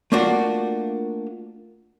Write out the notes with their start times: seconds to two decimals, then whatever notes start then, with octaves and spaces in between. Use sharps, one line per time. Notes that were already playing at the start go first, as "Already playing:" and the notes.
0.12 A3 A#3 D4 F4 F#4